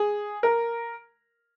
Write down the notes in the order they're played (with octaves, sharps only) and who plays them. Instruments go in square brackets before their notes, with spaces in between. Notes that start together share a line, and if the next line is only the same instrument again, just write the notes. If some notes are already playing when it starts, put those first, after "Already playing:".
Already playing: [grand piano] G#4
A#4